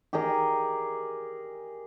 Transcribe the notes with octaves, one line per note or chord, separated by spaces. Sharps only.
G4 G#4 A#4 D#5